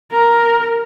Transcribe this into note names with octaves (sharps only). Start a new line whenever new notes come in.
A#4